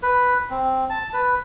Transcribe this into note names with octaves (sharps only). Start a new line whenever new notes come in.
B4
C4
A5
B4